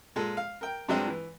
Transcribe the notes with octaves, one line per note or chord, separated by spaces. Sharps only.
A#2 G#3 A4
F5
A#4 G5
G2 F#3 G#3 C4 D4
E3